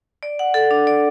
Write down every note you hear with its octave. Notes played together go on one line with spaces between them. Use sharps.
D5
F#5
A4
D4
D5